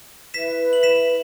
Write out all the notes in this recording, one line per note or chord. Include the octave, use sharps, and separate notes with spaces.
E4 B4 E5 B6 E7
F#7
B6 E7